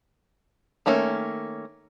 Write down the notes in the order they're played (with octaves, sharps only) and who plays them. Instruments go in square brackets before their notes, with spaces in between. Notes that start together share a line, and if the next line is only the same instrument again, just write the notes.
[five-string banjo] D#3 A3 A#3 C#4